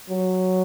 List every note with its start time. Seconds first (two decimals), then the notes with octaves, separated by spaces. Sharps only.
0.10 F#3